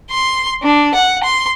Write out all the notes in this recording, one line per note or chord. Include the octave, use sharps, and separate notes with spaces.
C6
D4
F#5
C6